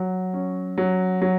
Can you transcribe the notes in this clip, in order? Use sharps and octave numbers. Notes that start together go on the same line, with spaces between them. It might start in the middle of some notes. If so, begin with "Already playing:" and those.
Already playing: F#3
C#4
F#3
F#3